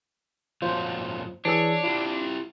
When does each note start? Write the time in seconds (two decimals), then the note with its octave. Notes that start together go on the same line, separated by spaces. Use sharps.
0.62 F#2 A#2 F3 F4 C5 C#5
1.45 E3 D4 G#4 C#5 E6
1.84 E4 F4 G4